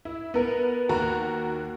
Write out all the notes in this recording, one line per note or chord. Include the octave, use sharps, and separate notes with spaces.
E4
B3 A#4
D#2 F#4 A#4 A#5